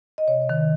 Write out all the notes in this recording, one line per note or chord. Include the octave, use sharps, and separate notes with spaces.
D#5
C3 C#5
D#3